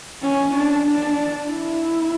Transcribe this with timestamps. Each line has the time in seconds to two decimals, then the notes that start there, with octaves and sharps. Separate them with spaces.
0.23 C#4
0.54 D4
0.87 D4
1.51 E4